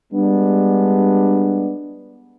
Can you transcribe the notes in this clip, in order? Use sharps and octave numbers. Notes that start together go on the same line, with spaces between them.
G3 G#3 B3 D4